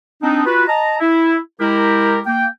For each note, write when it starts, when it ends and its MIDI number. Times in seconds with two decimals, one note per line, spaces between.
0.22 0.44 60
0.22 0.44 62
0.22 0.44 63
0.45 0.64 65
0.45 0.64 66
0.45 0.64 71
0.67 0.96 75
0.67 0.96 81
0.67 0.96 82
1.00 1.37 64
1.60 2.20 56
1.60 2.20 64
1.60 2.20 67
1.60 2.20 70
2.26 2.46 58
2.26 2.46 79